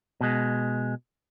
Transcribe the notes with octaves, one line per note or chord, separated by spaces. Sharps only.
B2 G#3